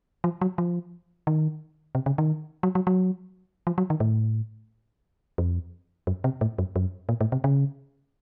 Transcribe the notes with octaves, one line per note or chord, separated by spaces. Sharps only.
F3
F#3
F3
D#3
C3
C#3
D#3
F#3
F#3
F#3
F3
F#3
D#3
A2
F2
F#2
C3
A2
F#2
F#2
A#2
A2
C3
C#3